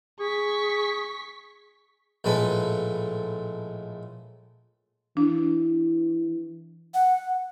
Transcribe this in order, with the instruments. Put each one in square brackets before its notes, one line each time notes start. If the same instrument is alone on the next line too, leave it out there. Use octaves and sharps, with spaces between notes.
[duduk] G#4 [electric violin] C#6 B6
[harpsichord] A#1 A2 G#3 A4 B4
[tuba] E3 [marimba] D4
[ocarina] F#5